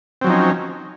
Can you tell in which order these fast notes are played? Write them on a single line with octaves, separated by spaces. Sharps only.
C4 F#3 F3 D#4 C#4